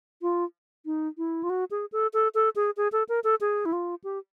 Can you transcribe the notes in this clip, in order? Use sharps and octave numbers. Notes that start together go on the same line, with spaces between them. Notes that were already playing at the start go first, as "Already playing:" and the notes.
F4
D#4
E4
F4
F#4
G#4
A4
A4
A4
G#4
G#4
A4
A#4
A4
G#4
E4
F4
G4